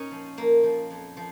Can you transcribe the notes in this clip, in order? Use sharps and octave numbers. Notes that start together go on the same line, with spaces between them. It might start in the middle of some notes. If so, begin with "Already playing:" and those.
Already playing: A#2 C#4 D#4
F3
F3 A#3
F3
F2
F3